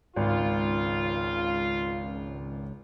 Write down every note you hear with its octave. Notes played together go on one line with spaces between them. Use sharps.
G#1 C#2 F4